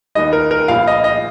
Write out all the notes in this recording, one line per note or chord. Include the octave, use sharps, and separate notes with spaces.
D#2 D#3 G3 D#5
A#4
A#4
A#1 A#2 G3 F5
D#5
D#5